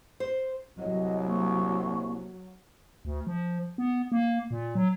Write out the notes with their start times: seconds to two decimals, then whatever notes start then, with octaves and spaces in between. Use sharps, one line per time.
0.20 C5
0.78 C2 F#3 D#5
1.27 A#3 C#6
3.05 D2
3.27 F3
3.78 B3
4.12 A#3
4.51 A#2
4.75 F#3